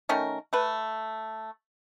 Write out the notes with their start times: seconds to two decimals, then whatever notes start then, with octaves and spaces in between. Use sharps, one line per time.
0.09 D#3 A3 C#4 A#4
0.53 A3 B4